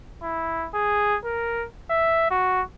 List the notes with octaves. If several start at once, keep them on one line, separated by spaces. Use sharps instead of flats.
E4
G#4
A#4
E5
F#4